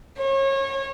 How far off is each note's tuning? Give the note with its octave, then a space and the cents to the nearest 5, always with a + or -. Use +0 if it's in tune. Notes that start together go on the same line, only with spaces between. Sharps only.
C#5 -30